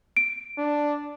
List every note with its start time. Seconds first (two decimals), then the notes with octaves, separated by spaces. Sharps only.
0.17 D7
0.57 D4